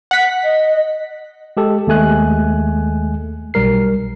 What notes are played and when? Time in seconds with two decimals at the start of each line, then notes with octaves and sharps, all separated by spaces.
0.11 F#5 B6
0.44 D#5
1.57 G#3 G4 A4
1.87 D#2 G#3 A3 G#5 F#6
3.54 B1 G3 A#4 C7